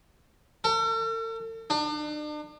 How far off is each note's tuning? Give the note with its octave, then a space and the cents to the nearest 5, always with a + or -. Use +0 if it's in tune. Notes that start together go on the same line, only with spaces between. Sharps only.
A4 +45
D4 +40